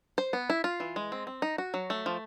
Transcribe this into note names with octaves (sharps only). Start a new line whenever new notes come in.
C5
B3
E4
F4
E3
G#3
C4
C4
D#4
F#4
F#3
A3
F3